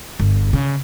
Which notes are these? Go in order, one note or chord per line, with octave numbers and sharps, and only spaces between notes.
G1
C#3